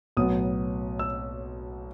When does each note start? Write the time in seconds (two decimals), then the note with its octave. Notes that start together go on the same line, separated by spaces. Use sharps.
0.17 B1 A2 F#3 B3 D#6
0.99 E6